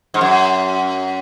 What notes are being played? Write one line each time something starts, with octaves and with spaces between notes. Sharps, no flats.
G#2
F#2